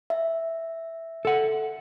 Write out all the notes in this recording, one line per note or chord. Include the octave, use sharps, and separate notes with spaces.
E5
A4 F#5